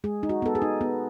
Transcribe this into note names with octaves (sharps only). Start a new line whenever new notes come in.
G#3 G#4
D#4
F#4
B3 A4
G#4
D#4
B3